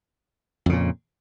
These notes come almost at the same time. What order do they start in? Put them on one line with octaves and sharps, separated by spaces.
F2 C#3 A#2